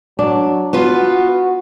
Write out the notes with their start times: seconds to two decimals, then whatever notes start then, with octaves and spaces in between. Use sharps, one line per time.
0.19 F#3 D4
0.73 B3 F4 F#4 B4